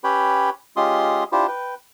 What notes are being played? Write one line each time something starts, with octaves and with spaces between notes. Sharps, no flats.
C#4 G4 B4 C#5 G5 B5
G#3 C#4 F4 G4 C6 D#6
D4 E4 F4 G4 C5
B4 G5